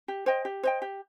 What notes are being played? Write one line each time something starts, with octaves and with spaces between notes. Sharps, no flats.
G4
C5 D#5 G5
G4
C5 D#5 G5
G4